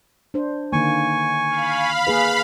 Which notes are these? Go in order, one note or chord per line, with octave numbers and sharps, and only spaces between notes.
D4 C5
D3 D#3 A#3 G#5 C#6
F5 B5
A#3 G#4 B4